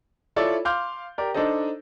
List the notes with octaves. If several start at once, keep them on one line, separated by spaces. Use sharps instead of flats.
E4 F4 A4 C#5 D5
F5 C6 D6 F6 G6
G4 A#4 D5
D4 D#4 A4 C5 D#5